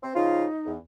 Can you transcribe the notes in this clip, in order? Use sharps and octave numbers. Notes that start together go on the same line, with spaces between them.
C4
C#3 F3 D#4 F4
E2